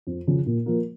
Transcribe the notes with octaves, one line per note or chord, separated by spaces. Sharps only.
F2
C#3 F3
A#2
F3 A#3